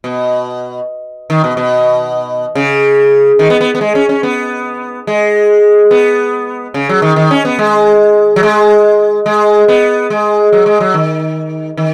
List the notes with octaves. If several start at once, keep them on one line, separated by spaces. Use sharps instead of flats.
B2
D#3
B2
B2
C#3
D#3
B3
B3
B3
G#3
C#4
C#4
B3
G#3
B3
C#3
F#3
D#3
D#3
C#4
B3
G#3
F#3
G#3
G#3
B3
G#3
F#3
G#3
F#3
D#3
D#3